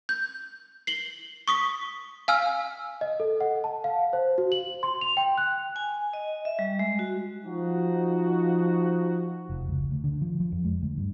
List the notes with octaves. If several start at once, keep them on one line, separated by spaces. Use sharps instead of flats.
G6
C7 F#7 G7
C#6 D#6 B6
F5 G#5 E6 F6
D#5
A4
F#5
A5
F5
C5
F#4
F#7
C6
F7
G5
F#6
G#5
D#5
E5
G3
G#3
F#4
F3 D#4 F#4
F1
C#2
D2
D3
F3
F3
F2
G#3
D2
G2